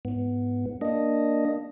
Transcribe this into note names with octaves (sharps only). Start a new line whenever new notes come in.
G#2 B3
A#3 D4 D#5